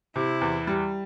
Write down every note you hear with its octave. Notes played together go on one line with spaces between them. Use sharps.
C3 E4
E2
G3